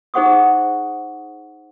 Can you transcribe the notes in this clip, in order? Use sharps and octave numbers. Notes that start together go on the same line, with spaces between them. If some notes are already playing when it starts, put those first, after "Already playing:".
D#4 G#4 C5 F#5 C#6 D#6